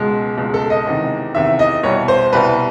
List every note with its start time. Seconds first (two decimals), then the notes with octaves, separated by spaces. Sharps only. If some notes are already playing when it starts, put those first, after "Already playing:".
Already playing: C#2 B2 G#3
0.38 C#2 B2 G#3
0.54 A4
0.70 D#5
0.86 E2 C3 D#3
1.35 E2 C3 D#3 E5
1.59 D#5
1.83 C2 B2 G3 C#5
2.08 C5
2.32 C2 B2 G3 B4